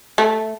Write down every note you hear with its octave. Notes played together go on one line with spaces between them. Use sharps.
A3